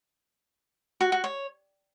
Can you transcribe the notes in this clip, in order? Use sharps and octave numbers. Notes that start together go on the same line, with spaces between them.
F#4
F#4
C#5